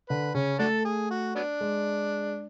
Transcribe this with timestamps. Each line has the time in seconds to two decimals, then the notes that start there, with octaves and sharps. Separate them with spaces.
0.09 D3 B4
0.35 C#3 C#4
0.59 A3 D4 F#4 A4
0.85 G#4
1.10 F#4
1.36 F#3 B3 D4
1.61 G#3